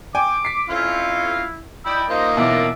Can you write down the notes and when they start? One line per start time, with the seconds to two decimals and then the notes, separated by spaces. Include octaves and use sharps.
0.15 G5 G#5 D6
0.45 B6 C7
0.70 F2 C4 C#4 E4 F4 F5
1.86 D5 D#5 G5 B5 E6
2.10 A#3 D#4 F4 C5 D#5
2.37 F#2 B2 E3 D4 E5 D6